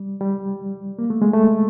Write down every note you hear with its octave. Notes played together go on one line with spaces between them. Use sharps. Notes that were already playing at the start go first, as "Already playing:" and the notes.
Already playing: G3
G3
A#3
A3
G#3
A3